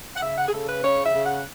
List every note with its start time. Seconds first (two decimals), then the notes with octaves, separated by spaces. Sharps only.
0.16 F#5
0.21 C#3 E5
0.37 F#5
0.48 G#4
0.52 C#3 A4
0.68 B4
0.83 C#3 C#5
1.04 E5
1.15 C#3
1.25 F#5